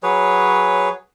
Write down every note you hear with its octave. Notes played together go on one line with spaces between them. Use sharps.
F#3 G#4 B4 C#5